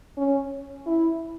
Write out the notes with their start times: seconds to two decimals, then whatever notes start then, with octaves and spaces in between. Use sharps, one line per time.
0.17 C#4
0.87 E4